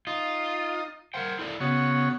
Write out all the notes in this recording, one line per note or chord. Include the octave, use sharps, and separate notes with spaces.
D#4 F4 D#5
A#4 C5 F#5 G5
E4 A4 D5
C#3 B3 F#4 C#5